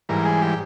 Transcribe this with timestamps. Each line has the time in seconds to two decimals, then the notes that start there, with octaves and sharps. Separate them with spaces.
0.09 G#2 E3 G3 A#4
0.25 G#4
0.42 G4